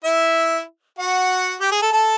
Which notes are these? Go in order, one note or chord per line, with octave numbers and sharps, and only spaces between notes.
E4 E5
F#4 F#5
G4 G5
G#4 G#5
A4 A5
A4 A5